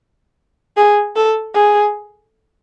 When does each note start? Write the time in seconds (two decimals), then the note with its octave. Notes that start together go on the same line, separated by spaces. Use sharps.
0.77 G#4
1.16 A4
1.55 G#4